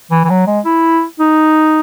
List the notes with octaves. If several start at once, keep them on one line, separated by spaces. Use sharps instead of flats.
E3
E3
F#3
G#3
E4
D#4